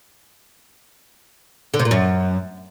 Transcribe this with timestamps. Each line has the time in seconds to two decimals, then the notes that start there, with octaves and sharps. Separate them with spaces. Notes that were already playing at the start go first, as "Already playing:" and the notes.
1.74 D3
1.79 C3
1.85 A#2
1.91 F#2